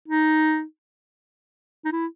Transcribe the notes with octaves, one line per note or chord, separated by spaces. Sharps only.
D#4
D#4
E4